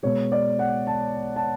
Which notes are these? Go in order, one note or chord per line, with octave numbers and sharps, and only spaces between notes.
B2 G#3 C#5
D5
F#5
A5
A5